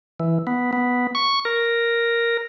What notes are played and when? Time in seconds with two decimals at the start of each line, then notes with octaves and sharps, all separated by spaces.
0.20 E3
0.47 B3
0.73 B3
1.15 C#6
1.45 A#4